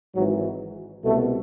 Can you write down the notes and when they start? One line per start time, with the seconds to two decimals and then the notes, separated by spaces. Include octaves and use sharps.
0.16 G#1 G#2 E3 F#3
1.04 C2 B2 A3